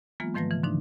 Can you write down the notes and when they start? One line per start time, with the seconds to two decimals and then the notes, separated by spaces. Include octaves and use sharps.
0.20 E3 F#3 G#3 A#3 B3 F4
0.34 G#2 D#3 F3 A3 B4 A#6
0.51 C#3 E3
0.63 G#2 D3 F3 D4 D#4